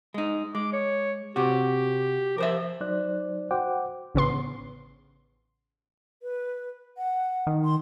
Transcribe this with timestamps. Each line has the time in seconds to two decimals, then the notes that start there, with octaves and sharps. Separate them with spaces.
0.14 G#3 D#4
0.55 G#3 D6
0.73 C#5
1.36 C3 F#4 G4
2.38 F3 A#4 C5 E5
2.81 F#3 D#4 C5 D5 F#6
3.51 F#4 C5 F#5 G5 D6
4.14 A1 C#3 B3 C6
6.22 B4
6.97 F#5
7.47 D#3
7.64 C6